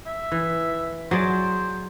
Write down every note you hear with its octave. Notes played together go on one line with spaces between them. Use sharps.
E5
E3
F#3 G#4 C5 D5